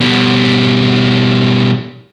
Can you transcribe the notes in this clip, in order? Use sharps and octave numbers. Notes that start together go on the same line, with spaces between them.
B2 G3